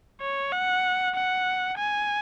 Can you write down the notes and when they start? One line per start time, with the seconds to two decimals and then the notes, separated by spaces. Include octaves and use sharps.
0.21 C#5
0.53 F#5
1.15 F#5
1.78 G#5